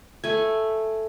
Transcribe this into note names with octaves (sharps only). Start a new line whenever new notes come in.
A3 G#5